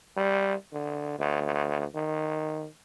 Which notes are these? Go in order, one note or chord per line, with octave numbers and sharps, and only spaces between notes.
G3
D3
D2
D#3